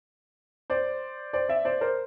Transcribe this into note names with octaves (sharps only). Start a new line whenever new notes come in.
C5 D5
C5 D5
D5 E5
C5 D5
A#4 C5